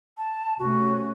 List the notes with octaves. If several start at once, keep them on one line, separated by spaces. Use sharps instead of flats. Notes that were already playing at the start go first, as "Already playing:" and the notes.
A5
C3 A3 C#4 F#4